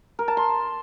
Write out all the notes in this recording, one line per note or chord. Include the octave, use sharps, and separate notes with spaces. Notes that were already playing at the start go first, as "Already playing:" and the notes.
A#4
A5
C6